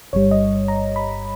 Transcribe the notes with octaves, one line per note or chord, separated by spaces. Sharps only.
G1 G2 G3 C#5
D#5
A#5
B5